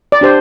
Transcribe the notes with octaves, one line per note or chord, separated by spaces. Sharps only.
D5
D4 G4 C5